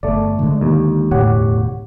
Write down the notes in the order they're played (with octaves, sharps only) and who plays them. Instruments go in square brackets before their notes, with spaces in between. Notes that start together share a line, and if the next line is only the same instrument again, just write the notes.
[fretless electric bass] G1 [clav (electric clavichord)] A3 D5
[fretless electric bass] D3 G#3
[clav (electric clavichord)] D#2
[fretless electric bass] E1 D2 A2 [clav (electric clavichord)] G4 C#5 F#5